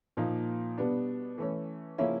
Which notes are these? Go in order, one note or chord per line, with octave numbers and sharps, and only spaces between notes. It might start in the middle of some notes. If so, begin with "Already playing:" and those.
A#2 F3 A#3 D#4
B2 G3 B3 D4
E3 A3 C#4
C#3 F3 A#3 C#4 E4